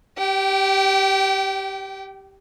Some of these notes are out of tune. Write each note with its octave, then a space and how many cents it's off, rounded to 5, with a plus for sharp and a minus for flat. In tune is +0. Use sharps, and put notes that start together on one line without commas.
G4 -5 G5 -30